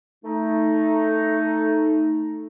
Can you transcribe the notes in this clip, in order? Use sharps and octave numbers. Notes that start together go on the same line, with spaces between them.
A3 D#4